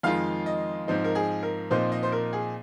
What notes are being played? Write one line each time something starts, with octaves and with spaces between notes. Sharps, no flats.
F2 D#3 G#3 F4 F5
D#5
G#2 F3 C4 D#4
A#4
G#4
A#4
A#2 F3 C4 D#4 C5
D#5
C5
A#4
G#4